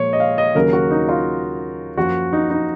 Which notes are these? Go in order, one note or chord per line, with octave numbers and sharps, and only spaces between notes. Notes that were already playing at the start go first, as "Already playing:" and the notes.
Already playing: A#2 F3 G#3 C#5
D#5
F5
D#5
D#2 C#3 F#3 A#3 A#4
F#4
D#4
F4
F#2 F3 A#3 F#4
D#4
D#4